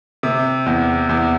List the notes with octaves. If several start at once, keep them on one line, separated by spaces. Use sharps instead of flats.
C3
E2
E2